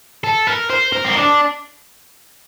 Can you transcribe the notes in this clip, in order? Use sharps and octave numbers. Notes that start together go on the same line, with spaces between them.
A4
A#4
C5
A#4
C4
D4